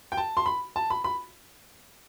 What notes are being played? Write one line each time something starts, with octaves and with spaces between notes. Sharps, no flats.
G5
A5
C6
B5
A5
B5
B5